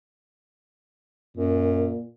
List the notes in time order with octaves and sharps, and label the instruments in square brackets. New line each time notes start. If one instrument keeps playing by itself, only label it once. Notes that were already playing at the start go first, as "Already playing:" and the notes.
[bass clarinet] F#2 [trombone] A#2